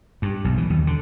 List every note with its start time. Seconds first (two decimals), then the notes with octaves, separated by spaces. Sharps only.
0.22 G2
0.44 B1
0.57 E3
0.70 D#2
0.87 D3